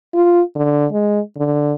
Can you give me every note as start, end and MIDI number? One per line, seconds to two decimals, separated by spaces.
0.14 0.41 65
0.55 0.86 50
0.92 1.20 56
1.37 1.74 50